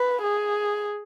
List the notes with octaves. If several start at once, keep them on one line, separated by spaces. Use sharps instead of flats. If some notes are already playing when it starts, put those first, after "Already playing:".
Already playing: B4
G#4